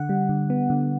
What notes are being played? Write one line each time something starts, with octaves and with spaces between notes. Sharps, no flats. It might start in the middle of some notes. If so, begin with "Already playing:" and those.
Already playing: D3 F#5
G3
D3
B3
D3